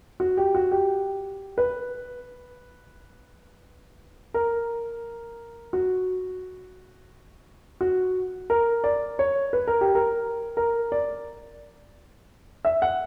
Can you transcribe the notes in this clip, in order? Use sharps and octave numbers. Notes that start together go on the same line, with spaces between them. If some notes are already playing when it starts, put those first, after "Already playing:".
F#4
G4
F#4
G4
B4
A#4
F#4
F#4
A#4
D5
C#5
B4
A#4
G4
A#4
A#4
D5
E5
F#5